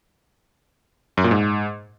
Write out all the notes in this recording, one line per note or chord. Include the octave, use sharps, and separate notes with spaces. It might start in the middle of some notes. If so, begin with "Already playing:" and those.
F#2
A#2
G#2